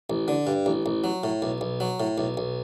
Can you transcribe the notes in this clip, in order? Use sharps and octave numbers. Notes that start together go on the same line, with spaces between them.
A1
D3
G2
A1
A1
F#3
A2
B1
B1
F#3
A2
B1
B1